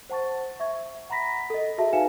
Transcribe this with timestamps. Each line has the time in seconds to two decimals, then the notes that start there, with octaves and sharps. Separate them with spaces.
0.09 C5 F#5 A5 C#6 A6
0.60 E5 C#6 G#6
1.10 F#5 A#5 B5 A#6 B6
1.50 A4 D#5
1.78 F#4 G#4 E5 A5
1.93 D#4 B4 F5 G#5 C#7 E7